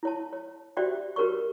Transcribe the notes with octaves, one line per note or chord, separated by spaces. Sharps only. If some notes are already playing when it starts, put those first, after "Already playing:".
E4 C#5 A5
C#5
F#4 G4 C5 D5 E5 G5
F#4 G4 A#4 B4 C#5 C#6